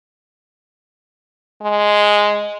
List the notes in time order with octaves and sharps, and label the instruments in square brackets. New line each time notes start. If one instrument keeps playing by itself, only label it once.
[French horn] G#3